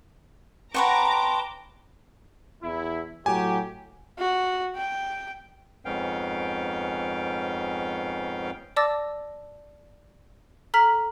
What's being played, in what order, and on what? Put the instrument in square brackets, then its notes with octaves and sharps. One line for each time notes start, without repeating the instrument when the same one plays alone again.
[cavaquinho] B4 C#5 F#5 [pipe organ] G5 A5 C6 [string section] A#5 D6
[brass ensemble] E2 E4
[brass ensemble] A2 F#3 G4 [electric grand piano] G#5
[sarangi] F#4
G5
[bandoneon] F2 G#2 B3 C#4 F5 G5
[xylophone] D5 A5 D6 E6 A6 A#6
A4 A#5 F6 B6 F#7